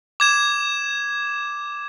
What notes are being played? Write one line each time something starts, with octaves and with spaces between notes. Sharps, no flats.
D6 G#6 E7